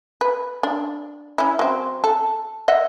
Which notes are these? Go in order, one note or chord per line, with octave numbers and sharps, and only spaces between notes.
B4
D4
C#4 E4
F#3 C4
A4
D#5 E5 F#5